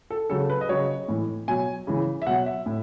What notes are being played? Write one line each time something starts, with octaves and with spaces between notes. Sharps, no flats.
A4
C#3 F#3 A4
B4
D#5
C#3 F#3 C#5
A2 E3
B2 F#3 G#5
C#3 E3
E5
B2 F#3 F#5
E5
A2